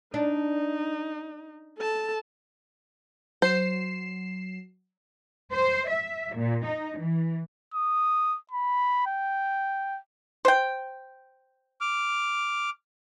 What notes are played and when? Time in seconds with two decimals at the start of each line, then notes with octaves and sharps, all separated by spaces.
0.14 D4 D#4
1.78 A4 A5
3.42 F#3 C5 C7 E7
5.53 C5
5.89 E5
6.37 A#2
6.66 D#4
6.99 E3
7.74 D#6
8.51 B5
9.07 G5
10.45 C5 G5
11.81 D6 F6